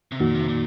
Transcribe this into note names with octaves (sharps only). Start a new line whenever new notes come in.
C3
F2 A#2 D#3 A#3 D#4 F#4
C3
A#2